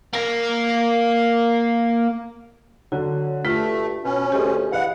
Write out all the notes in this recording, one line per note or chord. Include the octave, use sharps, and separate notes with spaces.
A#3 A#4
D3 F#3 F#4
G2 A3 F4 B6
B2 C#4
D2 G4 G#4 C#5 D#5 C6
E3 D#5 F5 F#5